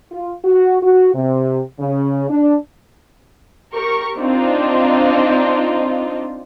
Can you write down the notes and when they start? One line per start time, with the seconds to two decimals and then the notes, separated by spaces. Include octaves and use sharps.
0.12 F4
0.44 F#4
0.82 F#4
1.15 C3
1.80 C#3
2.30 D4
3.74 G4 A#4 C#6
4.18 C4 D4 D#4 F4